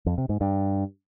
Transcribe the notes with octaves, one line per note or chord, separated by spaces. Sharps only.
F2
C3
G#2
G2